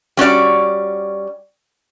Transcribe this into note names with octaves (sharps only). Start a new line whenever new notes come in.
G3 C#4 F#4 D5